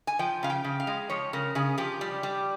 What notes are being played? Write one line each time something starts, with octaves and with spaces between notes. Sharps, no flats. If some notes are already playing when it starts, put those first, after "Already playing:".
G#5
F3 G5
C#3 F5
G5
C#3
F5
G#3
F3 C#5
C#3 A#4
C#3 G#4
F3 G4
G3
G3